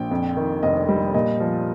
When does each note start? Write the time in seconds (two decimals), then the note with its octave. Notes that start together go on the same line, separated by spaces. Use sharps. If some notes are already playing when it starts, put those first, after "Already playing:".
Already playing: A#1 G5
0.11 F2
0.37 D#3
0.63 F1 D#5
0.89 G3
1.14 A#2 D#5
1.40 F3